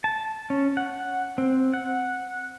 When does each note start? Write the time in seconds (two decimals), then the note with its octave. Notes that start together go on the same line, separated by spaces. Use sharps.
0.04 A5
0.50 C#4
0.77 F#5
1.38 C4
1.74 F#5